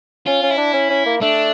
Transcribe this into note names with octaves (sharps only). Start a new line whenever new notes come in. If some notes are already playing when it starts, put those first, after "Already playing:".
C#4 F4
C#4
E4
D4
C#4
C#4
A#3
A3 D4